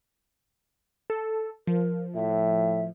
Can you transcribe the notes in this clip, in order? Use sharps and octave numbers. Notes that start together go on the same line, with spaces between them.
A4
F3 A#4
A2 E5